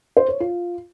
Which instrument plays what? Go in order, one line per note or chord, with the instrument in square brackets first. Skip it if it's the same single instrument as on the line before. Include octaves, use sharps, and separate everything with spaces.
[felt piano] C5
C#5
F4